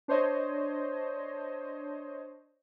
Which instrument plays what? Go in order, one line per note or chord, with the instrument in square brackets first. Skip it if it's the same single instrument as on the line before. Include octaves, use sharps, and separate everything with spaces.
[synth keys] D4 C5 C#5 D#5